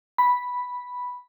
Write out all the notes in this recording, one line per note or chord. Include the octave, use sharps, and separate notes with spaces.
B5